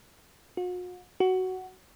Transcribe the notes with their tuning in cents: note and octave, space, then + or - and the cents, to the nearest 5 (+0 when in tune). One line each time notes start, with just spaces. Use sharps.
F#4 -45
F#4 +10